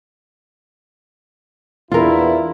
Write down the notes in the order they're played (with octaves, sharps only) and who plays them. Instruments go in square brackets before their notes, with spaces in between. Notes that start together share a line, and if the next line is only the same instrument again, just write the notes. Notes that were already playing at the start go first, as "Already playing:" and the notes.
[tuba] E2 [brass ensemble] B3 D4 E4 [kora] F4 A#4